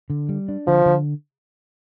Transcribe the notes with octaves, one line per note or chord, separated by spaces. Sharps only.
D3
G3
D4
D3 F3
D3